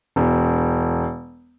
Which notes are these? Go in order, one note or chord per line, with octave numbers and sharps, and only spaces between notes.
E1